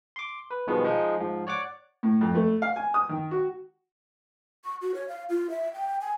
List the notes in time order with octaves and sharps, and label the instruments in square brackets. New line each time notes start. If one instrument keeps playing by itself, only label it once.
[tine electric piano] C6 D6
B4
B2 D#3 F3 G3 G#3 B3
F3 G#3 D#4
G#2 F3
C#5 D5 F#5 D6
[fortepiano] A2
F2
A3
F5
G#5
D#6
D#3
F#4
[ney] C#6
F#4
C#5
F5
F4
E5
G5
G#5